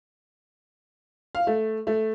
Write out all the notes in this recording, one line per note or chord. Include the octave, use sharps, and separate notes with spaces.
F5
A3
A3